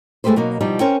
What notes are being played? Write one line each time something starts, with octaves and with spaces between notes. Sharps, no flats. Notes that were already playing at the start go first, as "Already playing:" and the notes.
G#3 A3 C4 G4 B4 C5
B2 F#3 A#3 D#4
B2 F3 G3 D#4
C#4 A#4 C5 C#5 G5